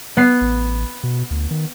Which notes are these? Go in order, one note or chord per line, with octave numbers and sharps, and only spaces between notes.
B3 C7
A1
B2
D2
D#3